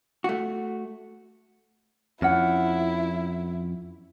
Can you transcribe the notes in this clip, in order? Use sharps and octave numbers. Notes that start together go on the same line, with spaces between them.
A3 F#4
F2 C#4 E4 F#5